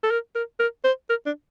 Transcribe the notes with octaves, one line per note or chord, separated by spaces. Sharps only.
A4
A#4
A#4
A#4
C5
A#4
D4